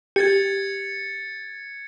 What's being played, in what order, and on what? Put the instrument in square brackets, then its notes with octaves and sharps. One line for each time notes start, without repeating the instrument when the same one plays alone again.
[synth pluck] G4 [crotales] G#6 A6 C#7